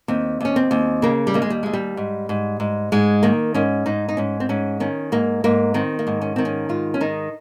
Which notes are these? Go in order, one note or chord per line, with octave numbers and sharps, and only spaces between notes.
D#2 C4
D#2 C#4
C4
D#2
C#3 A#3
G3
D#2 A#3
G#3
G3
D#2 G#3
G3
G#2
G#2
G#2
G#2 G#3
D#3 A#3
G#2 C#4
G#2 D#4
D#4
G#2 C#4
C4
G#2 C#4
D#3 C#4
G#2 A#3
G#2 A#3
D#3 C4
A#3
G#2
C#4
D#3 C4
C#4
G#2 F4
C#4
D#3 D#4